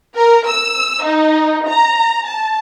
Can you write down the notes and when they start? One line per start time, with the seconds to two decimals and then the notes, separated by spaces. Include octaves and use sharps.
0.16 A#4
0.46 E6
1.04 D#4
1.67 A#5
2.26 A5